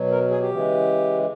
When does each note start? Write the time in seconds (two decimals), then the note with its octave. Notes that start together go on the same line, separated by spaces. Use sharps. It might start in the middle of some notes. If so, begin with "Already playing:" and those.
Already playing: B2 F#3
0.11 A#4
0.30 G#4
0.40 G4
0.50 C#3 E3 G#3